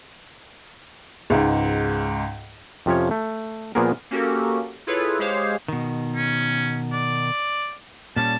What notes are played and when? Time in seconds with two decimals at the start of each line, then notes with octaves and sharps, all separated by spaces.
1.30 C#2 G#2
2.86 F2 C3 F3 C#4 C#5
3.11 A3
3.75 A#2 F3 A#3 B3 G#4 A#4
4.11 A#3 C#4 F#4 G4 A4 A#4
4.87 E4 F4 G#4 A4 B4 C#5
5.19 G#3 G4 G#4 C5 C#5 F5
5.68 B2 D#3
6.16 C#4
6.93 D5
8.16 A#2 G3 C#4 A5